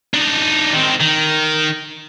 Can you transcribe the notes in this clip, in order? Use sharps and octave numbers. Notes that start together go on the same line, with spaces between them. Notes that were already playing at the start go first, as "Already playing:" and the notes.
D4 D#4
D#3 C4
D#3